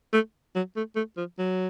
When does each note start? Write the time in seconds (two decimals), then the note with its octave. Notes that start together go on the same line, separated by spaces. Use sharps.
0.13 A3
0.55 F#3
0.76 A3
0.96 A3
1.17 F3
1.39 F#3